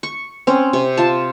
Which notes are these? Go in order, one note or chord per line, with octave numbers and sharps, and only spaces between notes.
C#6
C4 C#4
C3
F4 A5